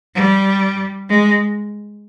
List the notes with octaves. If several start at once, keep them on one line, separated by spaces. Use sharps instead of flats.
G3
G#3